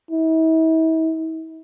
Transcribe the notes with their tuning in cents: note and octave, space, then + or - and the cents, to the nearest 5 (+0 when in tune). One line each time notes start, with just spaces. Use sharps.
E4 -40